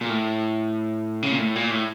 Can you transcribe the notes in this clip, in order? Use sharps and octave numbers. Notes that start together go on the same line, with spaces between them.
A#2
A2
C#3
A#2
A2
A#2
A2